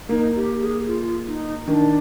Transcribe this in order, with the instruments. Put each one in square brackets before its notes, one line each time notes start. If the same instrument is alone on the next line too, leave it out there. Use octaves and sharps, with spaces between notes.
[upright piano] A#3 [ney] D#4
[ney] G4
G#4
F4
D#4
[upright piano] D#3 [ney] D4